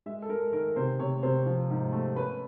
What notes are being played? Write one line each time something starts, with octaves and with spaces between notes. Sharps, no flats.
G#3 E5
A4
G#3 A#4
D#3 A#4
C3 C5
C3 C#5
C3 C5
F3
G#2
A3
C#4 B4